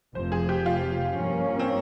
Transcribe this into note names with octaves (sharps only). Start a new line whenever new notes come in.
F1 F2 C3 F3 C5
G#4
G4
F4
G2 F3 A#3 C#4
C4